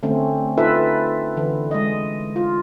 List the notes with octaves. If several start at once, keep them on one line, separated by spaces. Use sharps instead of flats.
D3 A3 C4 C#4
D#4 F4 A4 B4 E5
D3 E3
G#3 D#5
F4